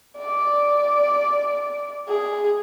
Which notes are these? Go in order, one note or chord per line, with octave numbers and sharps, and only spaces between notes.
D5
G#4